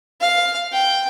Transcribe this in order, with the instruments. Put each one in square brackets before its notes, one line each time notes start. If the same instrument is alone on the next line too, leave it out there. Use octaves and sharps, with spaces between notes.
[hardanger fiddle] F5
G5